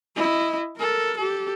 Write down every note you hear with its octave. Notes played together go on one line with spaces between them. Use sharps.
E4 D#5
A4 A#4
G4 A4